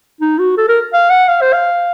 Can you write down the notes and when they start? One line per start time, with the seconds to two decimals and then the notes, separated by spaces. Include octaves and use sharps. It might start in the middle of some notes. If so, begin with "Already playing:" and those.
0.21 D#4
0.39 F#4
0.57 A4
0.69 A#4
0.93 F5
1.10 F#5
1.29 F5
1.41 C5
1.53 F5